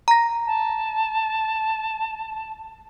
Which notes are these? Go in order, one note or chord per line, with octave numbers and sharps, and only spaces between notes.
A#5 A#6
A5